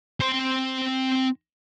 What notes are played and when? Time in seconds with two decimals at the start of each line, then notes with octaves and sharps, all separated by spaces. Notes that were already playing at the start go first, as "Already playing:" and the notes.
0.20 C4 C6